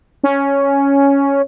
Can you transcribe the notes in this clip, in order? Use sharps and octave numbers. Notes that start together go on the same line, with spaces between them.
C#4